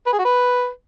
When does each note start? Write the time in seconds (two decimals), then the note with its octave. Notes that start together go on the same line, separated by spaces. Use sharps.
0.06 B4
0.13 G#4
0.19 F#4
0.25 B4